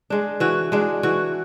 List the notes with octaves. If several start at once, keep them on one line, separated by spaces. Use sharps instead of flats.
G#3 D4
E3 F#4
G#3 D4
E3 F#4